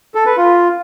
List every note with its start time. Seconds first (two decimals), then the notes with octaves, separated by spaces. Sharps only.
0.15 A4
0.26 B4
0.37 F4